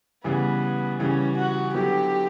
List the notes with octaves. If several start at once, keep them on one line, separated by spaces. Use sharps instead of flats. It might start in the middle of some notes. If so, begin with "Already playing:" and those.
C#3 E3 G3 B3
C#3 E3 G3 C#4
F#4
D3 F#3 B3 E4 G4